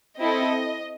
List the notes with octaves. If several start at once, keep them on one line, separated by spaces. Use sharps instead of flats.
C4 E4 A4 D#5